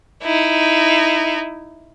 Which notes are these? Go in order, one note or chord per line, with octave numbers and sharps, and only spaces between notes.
D#4 E4